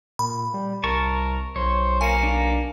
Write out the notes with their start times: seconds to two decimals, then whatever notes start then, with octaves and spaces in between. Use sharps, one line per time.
0.19 A#2 B5
0.54 G3
0.84 C2 A#4 A5 C#6
1.56 B1 C5 C#5
2.01 A#3 G#5 C#7
2.23 D4